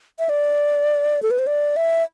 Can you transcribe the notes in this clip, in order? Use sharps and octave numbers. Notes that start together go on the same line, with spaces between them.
E5
D5
A4
B4
C5
D5
E5